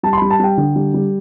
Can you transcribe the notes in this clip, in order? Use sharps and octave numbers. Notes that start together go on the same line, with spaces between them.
G3 A5
C6
G3 B5
A5
G3 G5
D3
G3
G3